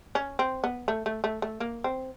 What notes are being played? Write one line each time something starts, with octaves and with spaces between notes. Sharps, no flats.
C#4
C4
B3
A3
A3
A3
A3
A#3
C4